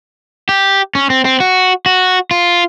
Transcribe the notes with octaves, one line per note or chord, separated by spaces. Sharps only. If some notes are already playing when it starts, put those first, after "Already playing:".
G4
C#4
C4
C4
F#4
F#4
F4